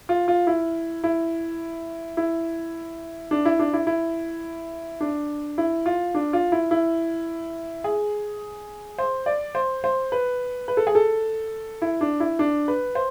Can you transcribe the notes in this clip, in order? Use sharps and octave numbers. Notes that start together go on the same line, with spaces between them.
F4
F4
E4
E4
E4
D4
E4
D4
E4
E4
D4
E4
F4
D4
F4
E4
E4
G#4
C5
D5
C5
C5
B4
B4
A4
G#4
A4
E4
D4
E4
D4
B4
C5